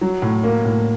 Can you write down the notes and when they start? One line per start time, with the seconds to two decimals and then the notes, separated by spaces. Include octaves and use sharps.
0.01 F#3
0.22 A2
0.43 A#3
0.65 A2